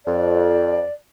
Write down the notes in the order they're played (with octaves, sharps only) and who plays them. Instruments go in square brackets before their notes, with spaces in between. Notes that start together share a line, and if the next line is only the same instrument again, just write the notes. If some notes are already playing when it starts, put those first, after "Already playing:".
[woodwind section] F2 [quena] D5